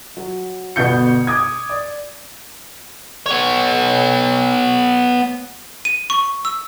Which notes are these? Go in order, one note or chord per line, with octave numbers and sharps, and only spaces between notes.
F#3
G1 B2 B3 G6 C#7
D6 D#6 G#6
D5
B3 C#5
D#7
C#6
E6